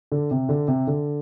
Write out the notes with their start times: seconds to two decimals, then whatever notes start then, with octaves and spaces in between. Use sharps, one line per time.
0.12 D3
0.31 C3
0.49 D3
0.68 C3
0.87 D3